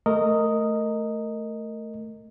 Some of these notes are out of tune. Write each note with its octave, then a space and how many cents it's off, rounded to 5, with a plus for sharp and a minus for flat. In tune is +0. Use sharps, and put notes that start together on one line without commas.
A3 +0 A#4 -15 D#5 +0